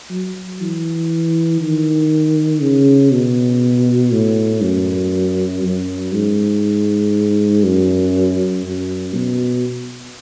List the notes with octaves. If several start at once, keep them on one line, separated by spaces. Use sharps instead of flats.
F#3
E3
D#3
C#3
B2
A2
F#2
F#2
G#2
F#2
F#2
B2